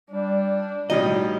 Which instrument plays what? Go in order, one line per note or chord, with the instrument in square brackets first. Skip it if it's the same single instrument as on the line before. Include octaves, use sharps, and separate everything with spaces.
[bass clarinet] G3 [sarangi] D4
[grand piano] A1 G3 D#4 [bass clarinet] B2 [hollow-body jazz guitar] D#5